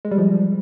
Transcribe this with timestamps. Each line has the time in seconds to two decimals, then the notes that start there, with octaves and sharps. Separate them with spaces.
0.05 G#3
0.11 G3
0.18 F3